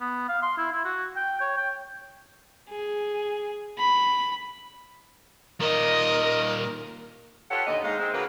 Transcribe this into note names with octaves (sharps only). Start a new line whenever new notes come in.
B3
F5
C6
E4
E4
F#4
G5
C#5
G5
G#4
B5
A#2 D#3 A#4 D#5
F4 G4 A4 B4 C#5 F#5
D#2 A#2 D3 D#5
G#2 G#3 D#4 F5
G#3 C4
C#3 F#3 A#3 F#4 B4